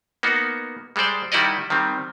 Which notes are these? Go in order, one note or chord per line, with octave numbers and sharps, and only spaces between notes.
A#3 B3 D#4 F#4
G3 G#3 A4 C5 D5
D#3 G3 E4 F#4 D5 D#5
D#3 G3 C4